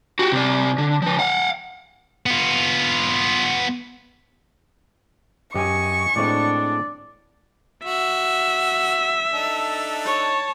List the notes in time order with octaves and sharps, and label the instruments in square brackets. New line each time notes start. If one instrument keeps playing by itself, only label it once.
[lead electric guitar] F#4 G4
C3 D5
D3
F3 B4
F5 F#5
[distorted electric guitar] B3 F4
[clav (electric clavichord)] F#2 G4 [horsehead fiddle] D#5 G#5 [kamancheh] C#6
[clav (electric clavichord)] A2 G#3 C4 [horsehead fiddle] D4 [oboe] D5
[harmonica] F#4 [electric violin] E5
[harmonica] D4 D#4 A4
[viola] C#5 A5